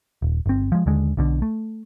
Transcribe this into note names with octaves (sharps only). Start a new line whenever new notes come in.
D#1
G1 C4
F3 G#3
D#2 D3 G#3
B1 B2 D3
A3